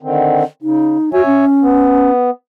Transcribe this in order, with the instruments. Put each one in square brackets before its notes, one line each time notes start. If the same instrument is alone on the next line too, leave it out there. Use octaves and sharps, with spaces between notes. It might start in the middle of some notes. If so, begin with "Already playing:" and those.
[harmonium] D3 D#3 C4
[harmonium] C#3 [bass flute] D#4
[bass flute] F#4 [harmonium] C#5 E5 G#5
[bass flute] C#4
[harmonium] B3